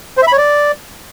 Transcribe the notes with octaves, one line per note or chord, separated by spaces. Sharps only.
C5
E5
B5
C#5
D5